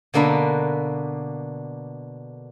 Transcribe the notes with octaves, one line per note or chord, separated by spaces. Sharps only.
B2 D3 A#3 D4 B4